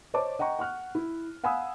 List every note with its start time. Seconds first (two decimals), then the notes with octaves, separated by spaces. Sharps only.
0.14 C5 C#5 D#5 A5 D6
0.39 D#5 F#5 G5 A#5 C#6
0.59 F#5 C#6 F6 F#6
0.95 E4
1.44 F5 F#5 G#5 B5 D#6 E6